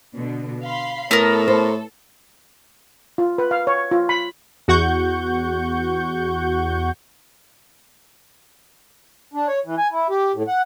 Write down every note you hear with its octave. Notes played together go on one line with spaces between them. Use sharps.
B2 D3
F5 B5 C6
A2 B3 A4 A#4
C5
F4
B4
F5
C#5
F4
B5
E2 F#4 F#5 C#6 G6
D4
C#5
E3
G#5
E4
G4
A2
F#5